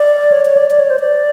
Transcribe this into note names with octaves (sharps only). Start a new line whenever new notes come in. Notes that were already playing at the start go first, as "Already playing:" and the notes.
Already playing: D5
C#5
C#5
D5
D5
C#5
C5
D5